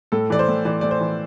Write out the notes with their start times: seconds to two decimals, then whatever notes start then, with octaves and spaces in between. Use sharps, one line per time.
0.12 A2 A4
0.30 E3 D5
0.39 C5
0.48 A2
0.65 E3 D5
0.81 A2 D5
0.91 C5
1.01 E3